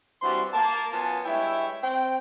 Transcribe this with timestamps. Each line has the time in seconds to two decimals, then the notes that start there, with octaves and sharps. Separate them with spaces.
0.22 E3 G3 C4 D4 F#4 C6
0.53 A#3 A#4 A5
0.91 F#2 B3 F4 G#5 A5
1.25 G2 G#3 E4 C#5 E5 G5
1.83 C4 G5